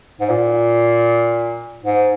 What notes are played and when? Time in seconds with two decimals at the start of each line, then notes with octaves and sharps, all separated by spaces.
0.21 G#2
0.30 A#2
1.83 G#2